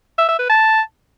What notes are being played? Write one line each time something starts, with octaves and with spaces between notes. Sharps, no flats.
E5
E5
B4
A5